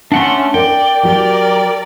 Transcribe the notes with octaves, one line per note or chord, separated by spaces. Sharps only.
A3 C#4 D4 F#5 C6
A#4 D5 G5
F#3 G4 A#4 D5